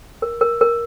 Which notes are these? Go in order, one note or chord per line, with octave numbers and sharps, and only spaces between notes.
A#4
A#4
A#4